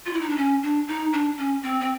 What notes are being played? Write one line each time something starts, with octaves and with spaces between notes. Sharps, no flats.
F4
E4
D#4
D4
C#4
D4
D#4
D4
C#4
C4
C4